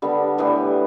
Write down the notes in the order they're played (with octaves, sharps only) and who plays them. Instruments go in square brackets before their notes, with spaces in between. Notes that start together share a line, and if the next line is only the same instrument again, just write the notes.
[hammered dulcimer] D3 G3 B3
A2 E3 G3 B3